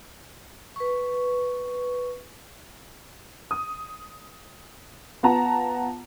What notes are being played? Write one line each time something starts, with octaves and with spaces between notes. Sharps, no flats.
B4 C#6
D#6
B3 F4 F#5 A5 A#5